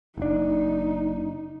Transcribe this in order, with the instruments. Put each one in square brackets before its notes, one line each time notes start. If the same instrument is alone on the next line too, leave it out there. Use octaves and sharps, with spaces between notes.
[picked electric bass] F#1 D4 [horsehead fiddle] D#4